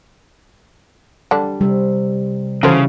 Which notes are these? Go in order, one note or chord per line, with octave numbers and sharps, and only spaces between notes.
D3 G3 D4
C3 G3
C#3 E3 G3 F#4 A4 C5